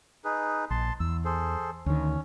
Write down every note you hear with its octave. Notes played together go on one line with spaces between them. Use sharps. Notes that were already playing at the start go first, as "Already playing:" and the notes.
D#4 G#4 B4
A#1 A5 C6
E2 E6
G#4 A4 C5
D2 D#3 C#4